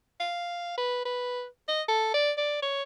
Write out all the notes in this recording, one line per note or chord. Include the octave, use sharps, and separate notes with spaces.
F5
B4
B4
D#5
A4
D5
D5
C#5